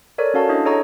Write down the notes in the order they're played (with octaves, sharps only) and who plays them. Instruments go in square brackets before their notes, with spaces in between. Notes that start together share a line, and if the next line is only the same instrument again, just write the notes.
[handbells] A4 A#4 C#5 D5
C#4 F#4 A4 F5 A5
D4 E4 D#5
G#4 A4 C#5 D#5 A#5 C#6